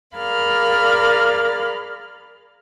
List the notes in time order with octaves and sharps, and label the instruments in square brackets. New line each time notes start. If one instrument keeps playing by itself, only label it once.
[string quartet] G#4 A#4 D5 F5 B5 F6